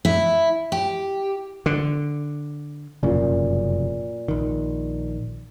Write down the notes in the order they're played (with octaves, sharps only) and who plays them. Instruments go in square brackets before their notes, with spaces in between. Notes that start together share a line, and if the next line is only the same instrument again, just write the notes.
[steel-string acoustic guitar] E4
G4
[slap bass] D3
[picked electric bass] F1 F#2 C#3 [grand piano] A#2
[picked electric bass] A#1 D#3